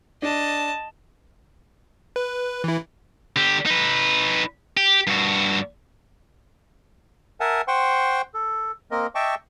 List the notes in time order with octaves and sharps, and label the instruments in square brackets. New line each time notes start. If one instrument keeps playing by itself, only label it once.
[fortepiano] D4 [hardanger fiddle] D#5 A5
[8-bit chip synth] B4
E3 E4
[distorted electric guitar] D3 G4
D#4 B4
G4
G2 F#4
[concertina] A#4 E5 F#5 G#5 A5
C5 F#5 G5 C6 C#6
A4
A#3 C4 A#4 D#5
D#5 E5 G5 A5 C#6 D6